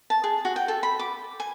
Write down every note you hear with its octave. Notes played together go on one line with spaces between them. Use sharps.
A5
G#4
F#4
G5
A4
B5
D6
G#5